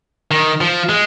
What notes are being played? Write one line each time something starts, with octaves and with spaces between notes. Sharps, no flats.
D#3
F3
G#3